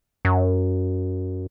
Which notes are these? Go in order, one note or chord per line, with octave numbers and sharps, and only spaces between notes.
F#2